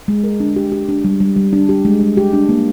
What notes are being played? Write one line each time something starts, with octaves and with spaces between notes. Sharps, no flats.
G#3
A#4
D4
G4
G4
D4
G3
G3
G3
D4
G4
G#3
G#3
G4
D4
A#3